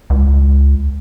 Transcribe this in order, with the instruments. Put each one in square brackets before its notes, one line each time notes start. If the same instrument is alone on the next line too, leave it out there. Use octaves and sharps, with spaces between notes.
[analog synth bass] C#2